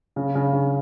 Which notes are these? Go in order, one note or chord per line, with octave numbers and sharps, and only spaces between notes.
C#3
C#3
C#3